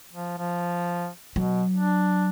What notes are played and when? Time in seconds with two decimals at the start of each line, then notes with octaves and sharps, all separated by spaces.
0.13 F3
0.38 F3
1.36 B2 F#3
1.76 D4